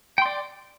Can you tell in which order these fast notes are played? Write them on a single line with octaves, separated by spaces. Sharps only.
G5 C6 D5